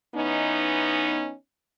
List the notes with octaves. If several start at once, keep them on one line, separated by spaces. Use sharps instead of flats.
E3 B3 C#4 D#4